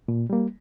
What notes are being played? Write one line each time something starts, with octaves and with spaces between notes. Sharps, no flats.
A#2
G3 A#3